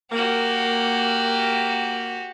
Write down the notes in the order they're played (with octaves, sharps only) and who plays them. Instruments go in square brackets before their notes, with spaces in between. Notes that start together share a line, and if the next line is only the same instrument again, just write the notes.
[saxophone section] A#3 [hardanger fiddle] F#4 G4